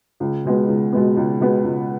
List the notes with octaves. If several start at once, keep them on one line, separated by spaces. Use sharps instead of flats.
C#2
B2 G#3 B3
C#2
B2 G#3 B3
C#2
B2 G#3 B3
C#2